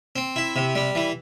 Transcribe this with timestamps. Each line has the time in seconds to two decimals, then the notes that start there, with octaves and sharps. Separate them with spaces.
0.16 C4
0.36 E4
0.56 C3
0.75 G3
0.95 E3